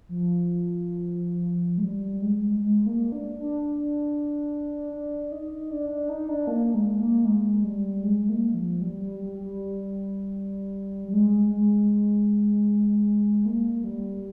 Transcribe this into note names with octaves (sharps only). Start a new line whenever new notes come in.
F3
G#3
G3
G#3
G#3
A#3
D4
D4
D4
D#4
D4
D4
D#4
D4
A#3
G#3
A#3
G#3
G3
G#3
A#3
F3
G3
G3
G3
G3
G3
G#3
G#3
A#3
G3